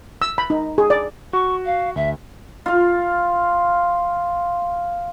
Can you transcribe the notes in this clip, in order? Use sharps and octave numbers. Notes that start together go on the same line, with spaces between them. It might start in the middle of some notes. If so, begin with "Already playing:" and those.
E6
B5
D#4
G#4
D5
F#4 C#6
F5
D2 E5
F4 F5